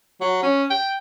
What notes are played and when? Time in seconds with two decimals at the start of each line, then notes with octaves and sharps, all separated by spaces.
0.21 F#3
0.43 C#4
0.70 G5